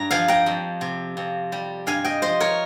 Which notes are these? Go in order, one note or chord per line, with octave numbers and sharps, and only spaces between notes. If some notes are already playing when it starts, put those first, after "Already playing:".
Already playing: G2 A#5
F3 F5 G#5
G5 A#5
F2
C3
F2
G3
G2 F5 G#5
D#5 G5
F3 C5 D#5
A#4 C#5